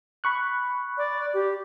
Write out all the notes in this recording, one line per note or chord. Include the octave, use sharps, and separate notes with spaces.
B5 C#6 F#6
D5
G4